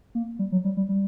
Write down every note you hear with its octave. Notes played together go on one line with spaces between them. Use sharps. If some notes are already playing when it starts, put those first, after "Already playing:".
A#3
G3
F#3
G3
G3
G3